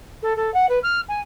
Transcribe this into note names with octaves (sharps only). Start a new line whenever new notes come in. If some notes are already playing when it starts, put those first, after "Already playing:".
A4
A4
F#5
B4
F6
G#5